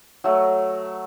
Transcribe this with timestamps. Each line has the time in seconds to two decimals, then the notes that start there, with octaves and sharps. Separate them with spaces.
0.24 F#3 A3